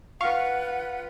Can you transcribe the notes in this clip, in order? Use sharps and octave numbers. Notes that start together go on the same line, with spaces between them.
F4 B4 F5 F#5 C#6